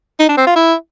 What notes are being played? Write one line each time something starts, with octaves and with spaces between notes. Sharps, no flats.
D#4
D4
C4
F4
E4